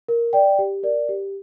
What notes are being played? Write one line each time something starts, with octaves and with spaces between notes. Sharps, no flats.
A#4
D5 G5
G4
A#4 D5
G4